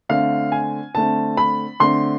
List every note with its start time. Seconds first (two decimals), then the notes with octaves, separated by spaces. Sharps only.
0.09 D3 A3 C4 F5
0.52 G#5
0.95 D3 A3 C4 A5
1.37 B5
1.80 D3 A3 C4 C6